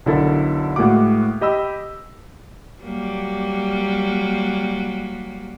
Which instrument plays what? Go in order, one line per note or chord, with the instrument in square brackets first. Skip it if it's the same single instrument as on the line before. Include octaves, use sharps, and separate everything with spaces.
[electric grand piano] B1 D3 E4 A4 A#4
A2 G#3 A#3 F#4 F#5 D6
G4 D#5 B5 E6
[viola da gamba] F#3 G3 A#3